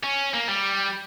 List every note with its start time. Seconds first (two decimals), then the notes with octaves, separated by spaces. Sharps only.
0.04 C#4
0.34 A#3
0.49 G3